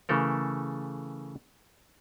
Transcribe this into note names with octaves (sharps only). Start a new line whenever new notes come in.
C#3 E3 A3 A4 A#4